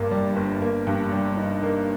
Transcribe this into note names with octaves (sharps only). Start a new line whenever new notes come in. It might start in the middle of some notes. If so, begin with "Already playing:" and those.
Already playing: G1 G2 G3 A#3
G3
G1
A#3
G2
G3
D#4
A#3